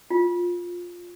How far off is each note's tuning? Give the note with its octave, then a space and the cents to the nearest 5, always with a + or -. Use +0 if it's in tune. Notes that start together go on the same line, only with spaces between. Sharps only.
F4 +10